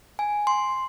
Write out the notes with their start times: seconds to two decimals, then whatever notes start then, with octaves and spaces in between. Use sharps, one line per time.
0.19 G#5
0.47 C6